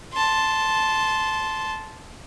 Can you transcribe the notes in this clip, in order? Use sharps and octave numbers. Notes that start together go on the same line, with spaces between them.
A5 C6